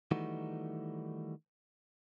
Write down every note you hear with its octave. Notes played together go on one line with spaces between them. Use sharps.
D#3 E3 G3 A3 D#4 F#4